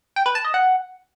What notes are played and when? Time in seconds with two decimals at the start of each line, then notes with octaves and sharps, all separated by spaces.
0.16 G5
0.26 B4
0.35 A5
0.45 D#5
0.54 F#5